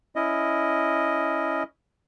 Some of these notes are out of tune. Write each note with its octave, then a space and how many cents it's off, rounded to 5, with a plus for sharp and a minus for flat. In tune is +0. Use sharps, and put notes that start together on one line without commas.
C#4 +10 E4 +0 D#5 +0